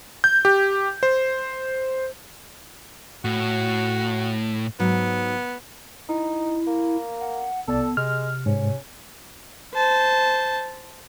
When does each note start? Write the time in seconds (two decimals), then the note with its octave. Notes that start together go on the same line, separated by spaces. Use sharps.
0.24 G6
0.45 G4
1.03 C5
3.25 A2 F#4
4.80 G#2 F#3 B3
6.09 D#4 E4
6.67 A#3
7.21 F#5
7.68 C2 B3 A4 D5 A5
7.97 C3 G#3 F6
8.46 G#2 C#4
9.74 C5 A5